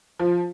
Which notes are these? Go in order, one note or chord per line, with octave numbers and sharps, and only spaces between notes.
F3